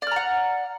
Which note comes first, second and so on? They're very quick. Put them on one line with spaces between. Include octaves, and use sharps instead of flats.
D5 F6 A#5 F#5